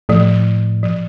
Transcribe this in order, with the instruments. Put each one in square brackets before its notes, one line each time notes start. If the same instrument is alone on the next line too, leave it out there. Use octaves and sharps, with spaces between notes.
[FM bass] A2 [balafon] F3
[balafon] F3